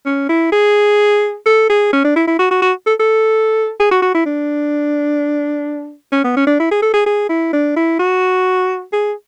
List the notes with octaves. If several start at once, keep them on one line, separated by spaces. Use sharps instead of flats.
C#4
E4
G#4
A4
G#4
C#4
D4
E4
E4
F#4
F#4
F#4
A4
A4
G#4
F#4
F#4
E4
D4
C#4
B3
C#4
D4
E4
G#4
A4
G#4
G#4
E4
D4
E4
F#4
G#4